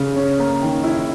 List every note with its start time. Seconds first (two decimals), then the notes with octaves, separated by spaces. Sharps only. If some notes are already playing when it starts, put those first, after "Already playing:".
Already playing: C#3
0.16 C#4
0.39 A#3
0.61 D#3
0.84 E4